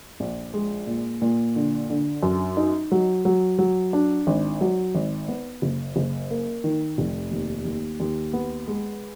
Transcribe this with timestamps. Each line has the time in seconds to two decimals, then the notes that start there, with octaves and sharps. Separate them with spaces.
0.20 A#1
0.54 G#3
0.87 A#2
1.22 A#2
1.56 D3
1.90 D3
2.23 F#2
2.57 D#4
2.92 F#3
3.25 F#3
3.59 F#3
3.93 D4
4.27 G#1
4.61 F#3
4.95 G#1
5.28 B3
5.62 F#1
5.96 F#1
6.30 A#3
6.64 D#3
6.98 F1
7.31 D#2
7.65 D#2
8.00 D#2
8.33 B3
8.68 G#3